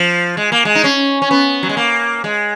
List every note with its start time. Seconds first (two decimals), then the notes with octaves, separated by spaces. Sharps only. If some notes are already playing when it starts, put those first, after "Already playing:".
Already playing: F3
0.37 G#3
0.52 A#3
0.65 G#3
0.75 D#4
0.84 C#4
1.22 C#4
1.31 B3
1.63 F#3
1.69 G#3
1.77 A#3
2.24 G#3